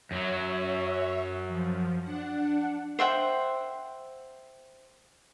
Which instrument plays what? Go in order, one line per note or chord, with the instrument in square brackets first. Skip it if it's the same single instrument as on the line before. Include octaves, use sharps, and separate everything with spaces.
[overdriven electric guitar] F#2 F#3 [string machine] C#5 E5
[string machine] F3
D4 F#5
[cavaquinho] C5 E5 F#5 G5